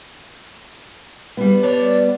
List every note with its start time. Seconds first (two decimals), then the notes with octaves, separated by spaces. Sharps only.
1.37 G3 B3
1.63 D4 C#5